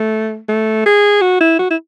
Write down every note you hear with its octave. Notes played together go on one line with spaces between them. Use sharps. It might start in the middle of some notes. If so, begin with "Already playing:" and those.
Already playing: A3
A3
G#4
F#4
E4
F#4
E4